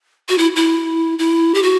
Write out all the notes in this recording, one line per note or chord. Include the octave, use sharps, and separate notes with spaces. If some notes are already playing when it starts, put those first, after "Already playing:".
F#4
E4
E4
E4
G4
F#4